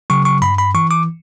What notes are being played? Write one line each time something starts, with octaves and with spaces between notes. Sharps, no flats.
C#3 F#3 C#6
C#6
G2 B5
B5
E3 C#6
D6